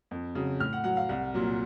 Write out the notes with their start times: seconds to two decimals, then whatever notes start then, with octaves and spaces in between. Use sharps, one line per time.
0.11 F2
0.35 C#3 F#3
0.60 A2 F6
0.73 F#5
0.84 F#3 F#5
0.97 F5
1.09 C2 F#5
1.34 A#2 F#3